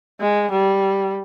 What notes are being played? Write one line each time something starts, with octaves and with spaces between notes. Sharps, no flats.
G#3
G3